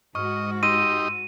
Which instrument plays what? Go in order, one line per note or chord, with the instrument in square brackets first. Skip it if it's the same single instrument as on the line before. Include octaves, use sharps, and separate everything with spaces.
[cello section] G#2 F#4 [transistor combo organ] D#5 [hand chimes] C#6 F6
[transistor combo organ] D#4 G4 D#5 [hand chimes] C6 E6 A#6 [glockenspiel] D#7